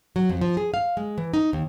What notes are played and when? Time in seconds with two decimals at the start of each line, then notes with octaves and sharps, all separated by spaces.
0.16 F#3
0.29 F2
0.41 F3
0.57 G#4
0.74 F5
0.97 G#3
1.18 E3
1.33 D#4
1.53 D#2